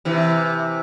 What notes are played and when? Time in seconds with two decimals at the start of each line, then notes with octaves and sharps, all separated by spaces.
0.05 C3 E3